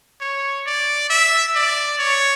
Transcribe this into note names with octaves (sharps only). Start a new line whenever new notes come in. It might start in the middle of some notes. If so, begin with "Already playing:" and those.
C#5
D5
E5
D5
C#5